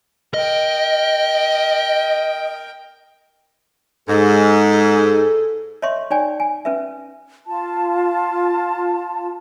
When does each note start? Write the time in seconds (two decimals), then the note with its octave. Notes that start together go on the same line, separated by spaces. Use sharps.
0.34 A#4 D#5 G5
4.08 G#2 A4
5.82 C#5 D#5 E5 C6 C#6
6.11 D#4 C#5 D5 G5 G#5
6.40 G#5
6.65 C#4 B4 E5
7.48 F4 A5